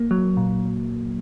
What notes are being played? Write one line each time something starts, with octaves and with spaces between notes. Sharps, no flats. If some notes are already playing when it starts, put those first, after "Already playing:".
Already playing: A#3
F#3
A#2